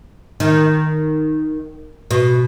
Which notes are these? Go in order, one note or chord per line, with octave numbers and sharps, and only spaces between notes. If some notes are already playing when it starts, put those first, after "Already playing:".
D#3
B2